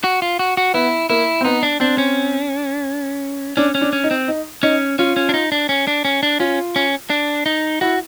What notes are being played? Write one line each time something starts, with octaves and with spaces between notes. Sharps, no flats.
F#4
F4
F#4
F#4
B3 E4
A#3 E4
C4
B3 D#4
D4
C4 D4
C#4
C#4 D4
C#4
D4
C#4
D#4
C4
D#4
C#4 D#4
C#4 F4
C#4
D4
D#4
D4
C#4
D4
C#4
D4
C#4 F4
C#4
D4
D#4
E4 F#4